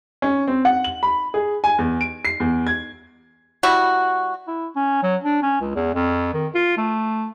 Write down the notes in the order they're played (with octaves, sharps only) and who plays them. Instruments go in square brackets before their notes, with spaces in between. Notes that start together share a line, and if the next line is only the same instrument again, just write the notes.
[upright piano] C#4
C4
F#5
F#7
B5
G#4
G#5
E2
D7
C7
E2
G#6
[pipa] G3 E4 F#4
[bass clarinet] E4
C#4
F#3
D4
C#4
C#2
E2
F2
D#3
F4
A3